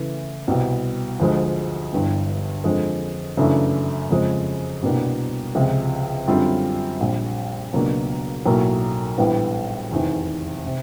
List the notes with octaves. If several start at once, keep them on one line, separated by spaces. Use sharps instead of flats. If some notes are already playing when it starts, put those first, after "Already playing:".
Already playing: C#3 E3 A3
C2 B2 G3
D2 D3 F3 G#3
G1 G2 E3 G3 B3
F2 D3 F3 G#3
F#2 C#3 E3 A3 D4
F2 C#3 F3 G#3
C2 B2 G3 A#3 D4
C#2 C3 F3 G#3
F#2 D3 G3 C4 F4
A#1 A#2 G3
C#2 B2 F#3 A#3 D4
B1 A2 F#3 A#3
A#1 A2 E3 G3 B3
F1 E2 C3 D#3
C3